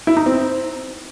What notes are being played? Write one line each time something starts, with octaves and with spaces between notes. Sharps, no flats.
E4
D#4
C4